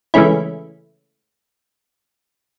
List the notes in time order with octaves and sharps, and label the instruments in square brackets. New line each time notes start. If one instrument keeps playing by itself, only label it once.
[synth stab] C#3 E3 G#3 A3 C#4 E4